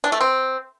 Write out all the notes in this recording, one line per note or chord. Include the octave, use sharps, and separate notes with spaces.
D4
A3
C4